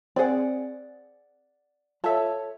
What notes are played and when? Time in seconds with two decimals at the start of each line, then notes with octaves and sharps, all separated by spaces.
0.16 C4 G#4 D5 F#5
2.04 F4 A4 C#5 E5 A5